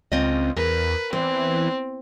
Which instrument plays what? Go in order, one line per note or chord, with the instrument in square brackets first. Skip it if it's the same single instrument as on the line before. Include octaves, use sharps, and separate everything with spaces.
[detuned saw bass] C#2 [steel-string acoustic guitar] C4 F4 D#5
[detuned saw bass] E2 [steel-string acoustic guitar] A#4 [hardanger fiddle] B4
[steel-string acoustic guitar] E2 [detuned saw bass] E3 [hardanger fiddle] C4